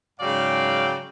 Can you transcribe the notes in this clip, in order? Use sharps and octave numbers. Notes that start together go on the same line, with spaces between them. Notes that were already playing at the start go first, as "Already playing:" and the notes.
G#2 C#3 F#3 D5 F5 G5